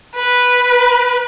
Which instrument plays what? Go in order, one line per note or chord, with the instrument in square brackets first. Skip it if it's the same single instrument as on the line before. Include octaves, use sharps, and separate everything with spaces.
[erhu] B4